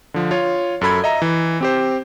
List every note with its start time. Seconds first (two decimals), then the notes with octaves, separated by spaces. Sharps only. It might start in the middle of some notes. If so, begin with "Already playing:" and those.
0.14 D3 F3
0.31 F4 C#5
0.81 F#2 A4 B5 G#6
1.04 D#5 E5 A#5
1.22 E3
1.61 C4 G4 C5